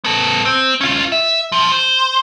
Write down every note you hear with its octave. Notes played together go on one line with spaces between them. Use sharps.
B3 A4
C4
C#4 F4
E5
B2 F3
C5